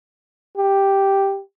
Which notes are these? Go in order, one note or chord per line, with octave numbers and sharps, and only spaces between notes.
G4